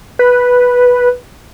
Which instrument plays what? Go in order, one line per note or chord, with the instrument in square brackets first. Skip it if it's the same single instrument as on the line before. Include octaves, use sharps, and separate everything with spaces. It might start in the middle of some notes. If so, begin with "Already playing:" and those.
[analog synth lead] B4